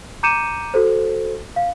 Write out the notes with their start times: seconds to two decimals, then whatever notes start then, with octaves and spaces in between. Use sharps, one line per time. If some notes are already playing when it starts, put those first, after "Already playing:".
0.23 A#5 D6 G6 C#7 D#7 E7
0.74 F#4 A4 C5
1.56 F5